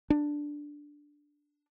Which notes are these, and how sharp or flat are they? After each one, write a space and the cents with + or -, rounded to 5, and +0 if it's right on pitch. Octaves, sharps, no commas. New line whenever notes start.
D4 +0